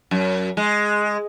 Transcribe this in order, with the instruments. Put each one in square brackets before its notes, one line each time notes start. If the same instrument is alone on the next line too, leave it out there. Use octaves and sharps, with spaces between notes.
[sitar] F#2
G#3